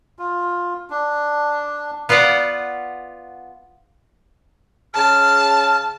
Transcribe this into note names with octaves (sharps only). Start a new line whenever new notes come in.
F4
D4
B3 F4 B4 D5 F#5
C#3 G#4 A5 F6